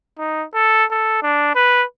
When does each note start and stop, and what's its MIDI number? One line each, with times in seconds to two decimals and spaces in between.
0.18 0.45 63
0.54 0.85 69
0.91 1.18 69
1.22 1.54 62
1.55 1.84 71